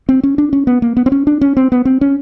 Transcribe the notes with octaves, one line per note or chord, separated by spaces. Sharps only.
C4
C#4
D4
C#4
B3
A#3
B3
C4
C#4
D4
C#4
C4
B3
C4
C#4